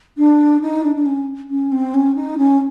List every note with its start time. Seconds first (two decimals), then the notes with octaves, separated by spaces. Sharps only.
0.17 D4
0.61 D#4
0.83 D4
0.95 D4
1.05 C#4
1.49 C#4
1.71 C4
1.94 C#4
2.15 D#4
2.37 C#4